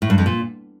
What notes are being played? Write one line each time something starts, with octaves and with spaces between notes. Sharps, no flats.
A2
G2
F2
A#2